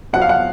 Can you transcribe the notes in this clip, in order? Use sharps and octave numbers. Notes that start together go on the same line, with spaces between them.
F2 C3 F#3 F#5
F5
F#5